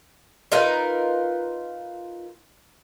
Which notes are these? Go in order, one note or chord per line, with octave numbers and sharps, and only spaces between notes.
D#4 F4 A#4 B4